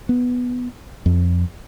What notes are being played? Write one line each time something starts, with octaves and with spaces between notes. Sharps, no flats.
B3
F2